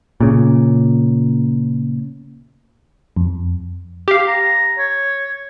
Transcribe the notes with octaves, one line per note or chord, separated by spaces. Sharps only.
A#2 C#3
F2
G4 F5
A#5
C#5